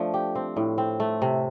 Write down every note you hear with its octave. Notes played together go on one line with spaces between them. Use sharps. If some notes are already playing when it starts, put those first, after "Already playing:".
Already playing: F3 A3 D4
G4
C4
A2
C4
A3
C3